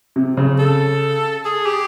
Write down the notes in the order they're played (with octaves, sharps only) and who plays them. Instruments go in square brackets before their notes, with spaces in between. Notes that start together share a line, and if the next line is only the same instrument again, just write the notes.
[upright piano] C3
C#3
[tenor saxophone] A4
G#4
G4